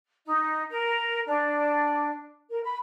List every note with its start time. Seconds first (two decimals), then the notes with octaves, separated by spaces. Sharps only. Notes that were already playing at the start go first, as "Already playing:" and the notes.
0.25 D#4
0.69 A#4
1.26 D4
2.50 A#4
2.62 B5